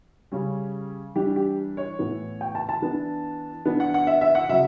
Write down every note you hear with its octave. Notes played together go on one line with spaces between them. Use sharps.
C#3 G3 C#4
E3 G3 D4 G4
G4
C#5
A2 E3 B3
G5
A5
A5
E3 B3 D4
E3 B3 D4
F#5
F#5
E5
E5
F#5
C#3 F#3 E5